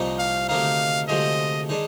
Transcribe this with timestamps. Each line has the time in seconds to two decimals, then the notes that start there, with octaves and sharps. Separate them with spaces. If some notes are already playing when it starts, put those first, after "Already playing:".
Already playing: C2 A#2 F3 C4 D#4
0.19 F5
0.49 D2 C3 D#3 A#3 D#4 F5
1.08 D2 C3 F3 G#3 C4 D#5
1.69 D#3 G#3 D4